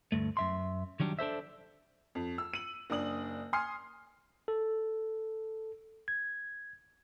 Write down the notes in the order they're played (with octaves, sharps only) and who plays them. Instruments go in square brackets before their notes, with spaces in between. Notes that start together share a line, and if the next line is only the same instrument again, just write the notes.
[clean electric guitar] D2 G2 A3
F#2 E5 C6
D#3 F#3 G3 D4
D4 A4 C5 E5
[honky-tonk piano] F2
E6
D#7 F#7
F#1 D4 D#6 F#7
G#5 C6 D#6 F6 C7
[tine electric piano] A4
G#6